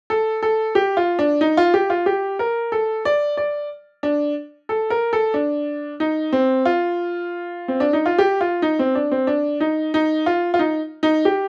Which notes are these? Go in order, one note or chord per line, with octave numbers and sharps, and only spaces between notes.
A4
A4
G4
F4
D4
D#4
F4
G4
F4
G4
A#4
A4
D5
D5
D4
A4
A#4
A4
D4
D#4
C4
F4
C4
D4
D#4
F4
G4
F4
D#4
C4
D4
C4
D4
D#4
D#4
F4
F4
D#4
D#4
G4